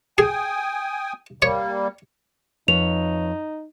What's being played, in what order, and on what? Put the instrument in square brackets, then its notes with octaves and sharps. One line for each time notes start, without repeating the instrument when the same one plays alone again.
[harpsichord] G#4 [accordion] G5 G#5 D#6
[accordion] G3 A#3 [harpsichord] C#5
[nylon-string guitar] F2 B4 C#5 [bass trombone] D#4 [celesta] F7